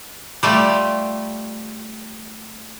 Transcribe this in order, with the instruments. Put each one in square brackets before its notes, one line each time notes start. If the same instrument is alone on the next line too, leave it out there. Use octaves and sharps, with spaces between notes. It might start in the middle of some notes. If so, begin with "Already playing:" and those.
[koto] G3 A3 F4 G4